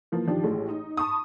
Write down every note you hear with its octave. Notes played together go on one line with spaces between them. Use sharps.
E3 F3 A#3
D#3 F3 D4 G4
A1 A2 G#3
D#4
A5 B5 C#6 D#6